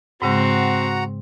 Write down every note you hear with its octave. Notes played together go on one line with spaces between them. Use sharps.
G#2 C#3 G#3 C4 F#4 F#5 A#5